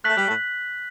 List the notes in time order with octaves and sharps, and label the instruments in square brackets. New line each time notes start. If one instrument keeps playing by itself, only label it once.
[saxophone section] A3 [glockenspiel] F#6 B6 F#7
[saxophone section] G3
A2 A3